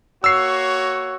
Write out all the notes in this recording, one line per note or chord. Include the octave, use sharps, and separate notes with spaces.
A#3 F#4 C#5 E6 C7